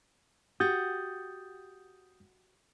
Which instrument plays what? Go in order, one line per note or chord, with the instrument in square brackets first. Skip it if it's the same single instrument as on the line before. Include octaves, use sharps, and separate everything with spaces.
[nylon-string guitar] F#4 G4 [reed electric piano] D#6 G6 A6